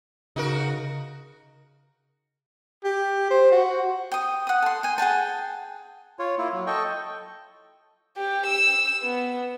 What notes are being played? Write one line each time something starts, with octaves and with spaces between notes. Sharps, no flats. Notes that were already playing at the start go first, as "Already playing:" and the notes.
C#3 D#4 F#4 A#4
G4
C5
F#4
G5 D#6
F#5 D#6
A4 C6
G5 G#5
G#4 F#5 G5 A5
F4 C#5
A#3 E4 F4
F#3
A4 D#5 G5 C#6
G4
E6
B3